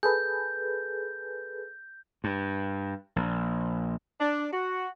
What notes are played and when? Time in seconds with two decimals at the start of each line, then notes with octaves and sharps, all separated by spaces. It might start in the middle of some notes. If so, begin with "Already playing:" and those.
0.03 G#4 A4 B4 G6
2.24 G2
3.16 A#1
4.19 D4
4.52 F#4